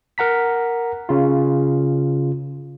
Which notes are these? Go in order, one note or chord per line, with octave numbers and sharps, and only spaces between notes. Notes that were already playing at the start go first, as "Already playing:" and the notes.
A#4 F#5 A#5 B6
C#3 F4